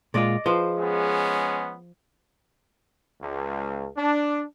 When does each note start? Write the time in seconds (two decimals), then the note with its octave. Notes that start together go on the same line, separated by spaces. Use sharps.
0.14 A#2 G#3 F4 D5 D#5
0.46 F3 G#4 B4 C5
0.78 G#3 B3 C#4
3.22 C#2
3.98 D4